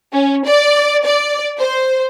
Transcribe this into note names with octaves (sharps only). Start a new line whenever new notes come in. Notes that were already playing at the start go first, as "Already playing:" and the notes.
C#4
D5
D5
C5